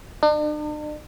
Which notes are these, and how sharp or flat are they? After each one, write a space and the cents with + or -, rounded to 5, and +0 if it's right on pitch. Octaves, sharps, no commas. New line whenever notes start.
D4 +45